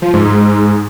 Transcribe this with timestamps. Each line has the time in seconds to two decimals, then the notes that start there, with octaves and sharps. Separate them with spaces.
0.02 F3
0.14 G#2
0.25 G#2